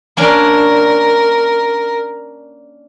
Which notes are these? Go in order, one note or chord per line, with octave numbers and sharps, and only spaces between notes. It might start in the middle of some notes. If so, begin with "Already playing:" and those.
A#3 C#4 D4 A#4